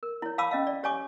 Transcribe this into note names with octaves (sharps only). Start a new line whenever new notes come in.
A#4
E4 C#5
F5 A5 B5 D6 E6
C#4 D#5 F5
D5
G4 C#5 D5 G#5 C#6 D6